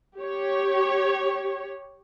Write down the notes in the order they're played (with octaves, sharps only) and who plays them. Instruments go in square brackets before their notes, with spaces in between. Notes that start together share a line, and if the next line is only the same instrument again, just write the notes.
[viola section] G4 C#5